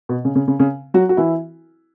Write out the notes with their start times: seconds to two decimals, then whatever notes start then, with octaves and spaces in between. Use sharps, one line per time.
0.09 B2
0.25 C#3
0.35 C#3
0.48 C#3
0.60 C#3
0.94 F#3 F#4
1.09 F#4
1.17 E3 E4